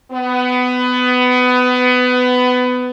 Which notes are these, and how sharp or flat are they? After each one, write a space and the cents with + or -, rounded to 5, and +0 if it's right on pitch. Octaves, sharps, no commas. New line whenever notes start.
B3 +20